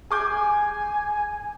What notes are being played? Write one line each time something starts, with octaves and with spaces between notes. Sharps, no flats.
G#4 G#5 D6 G6